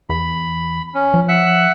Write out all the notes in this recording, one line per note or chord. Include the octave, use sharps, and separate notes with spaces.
E2 B5
C#4
F3
E5 F#5 F#6